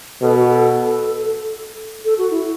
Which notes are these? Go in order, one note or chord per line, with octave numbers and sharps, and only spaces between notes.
B2 A4
F#4
A4
A4
F#4
E4